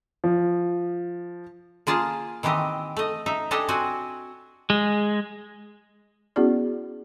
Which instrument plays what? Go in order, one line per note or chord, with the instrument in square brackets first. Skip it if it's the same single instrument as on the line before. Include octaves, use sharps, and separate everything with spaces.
[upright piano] F3
[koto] A#3 F4 G#4 A5
D#3 E3 C4 G4 D#5
A3 D#5
D#4 E5
D4 G4 A4 D#5 G#5 A5
C4 F#4 C5 G#5
[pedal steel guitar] G#3
[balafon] B3 C#4 E4 F#4 G#4 D5